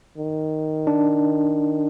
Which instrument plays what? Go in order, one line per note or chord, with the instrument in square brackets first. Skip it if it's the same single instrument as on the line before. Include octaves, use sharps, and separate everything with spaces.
[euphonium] D#3
[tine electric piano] D4